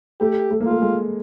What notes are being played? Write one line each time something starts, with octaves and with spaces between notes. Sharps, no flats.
A3 G4
A3
A#3
A3 F4
G#3